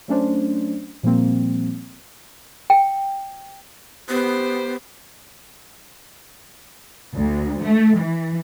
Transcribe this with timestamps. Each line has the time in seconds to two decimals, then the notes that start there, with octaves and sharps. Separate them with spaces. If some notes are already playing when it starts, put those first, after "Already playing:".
0.08 F#3 A3 C#4 D4 C5
1.03 A#2 F3 G3 A#3 C4
2.70 G5
4.09 B3 G4 C5
7.16 D2
7.63 A3
7.98 E3